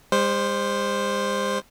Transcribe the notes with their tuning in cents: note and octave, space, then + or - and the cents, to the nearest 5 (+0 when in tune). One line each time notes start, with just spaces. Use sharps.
G3 +45 C5 +0